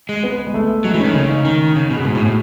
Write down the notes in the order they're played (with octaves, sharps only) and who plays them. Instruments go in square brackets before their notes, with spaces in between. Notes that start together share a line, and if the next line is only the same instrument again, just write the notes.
[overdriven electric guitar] G#3
[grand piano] B3
G#3
A3
[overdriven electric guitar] F#3 [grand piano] G#3
[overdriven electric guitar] E3
[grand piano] C#4
[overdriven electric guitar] D#3
[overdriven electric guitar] C#3 [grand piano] D#4
[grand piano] D#4
[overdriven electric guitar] D#3
C#3
B2
[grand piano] G#4
[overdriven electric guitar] G#2 [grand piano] F#4
[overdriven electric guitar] A2
[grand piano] F#4
[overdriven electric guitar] A2